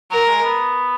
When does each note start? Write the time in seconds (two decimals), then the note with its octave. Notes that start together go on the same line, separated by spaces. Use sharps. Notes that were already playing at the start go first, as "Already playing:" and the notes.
0.11 F#3 A#4
0.27 G#3
0.43 B3